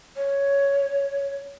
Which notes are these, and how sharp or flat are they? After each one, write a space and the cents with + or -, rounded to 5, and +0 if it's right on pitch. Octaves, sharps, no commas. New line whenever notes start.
C#5 +5